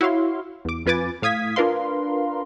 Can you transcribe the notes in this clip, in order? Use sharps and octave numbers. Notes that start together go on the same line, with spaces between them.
E4 F#4 C#5 F5 C6
E2 D6
F2 F4 B4 G#5 D6 A6
A2 F5 D#6 G#6 B6
D4 F4 A#4 B4 F5 C6